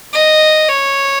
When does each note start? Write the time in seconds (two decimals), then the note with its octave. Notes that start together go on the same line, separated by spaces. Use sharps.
0.13 D#5
0.68 C#5